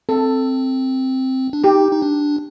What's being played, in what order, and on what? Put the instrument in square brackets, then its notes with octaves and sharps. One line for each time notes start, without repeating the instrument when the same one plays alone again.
[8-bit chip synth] C4 [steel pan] A4
[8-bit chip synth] D4
[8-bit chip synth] D#4 [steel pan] G4
[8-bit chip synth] D#4
D4